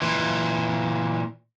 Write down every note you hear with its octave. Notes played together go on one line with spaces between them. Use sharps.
A#2 E3